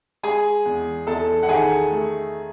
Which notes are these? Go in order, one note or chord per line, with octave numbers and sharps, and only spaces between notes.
G#3 G#4 G#5
E2
E2 A4 A5
F#5
D#3 G#4 G#5
A3